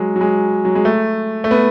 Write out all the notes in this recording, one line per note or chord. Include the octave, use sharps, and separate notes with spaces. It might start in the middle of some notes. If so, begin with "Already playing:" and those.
Already playing: F#3 G#3
F#3
G#3
F#3
G#3
A3
A3
B3